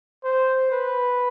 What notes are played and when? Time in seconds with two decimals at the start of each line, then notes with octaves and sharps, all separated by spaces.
0.24 C5
0.72 B4